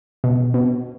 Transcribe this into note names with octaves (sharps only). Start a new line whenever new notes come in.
B2
B2